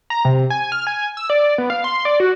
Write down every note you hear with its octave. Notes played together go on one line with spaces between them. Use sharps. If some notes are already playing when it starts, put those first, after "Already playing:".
A#5
C3
G#5
F6
G#5
E6
D5
B3
F5
C6
D5
F#4